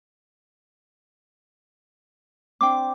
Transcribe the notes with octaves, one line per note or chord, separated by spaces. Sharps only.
C4 D4 G5 D6